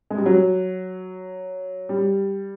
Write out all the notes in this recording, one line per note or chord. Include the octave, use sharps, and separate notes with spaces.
G#3
G3
F#3
G3